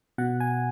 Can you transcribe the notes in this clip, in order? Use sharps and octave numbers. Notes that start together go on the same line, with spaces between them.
B2 F#5
G#5